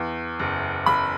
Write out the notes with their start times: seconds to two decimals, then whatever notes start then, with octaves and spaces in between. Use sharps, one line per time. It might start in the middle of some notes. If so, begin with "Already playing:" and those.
Already playing: E2
0.40 F#1
0.86 F#1 B5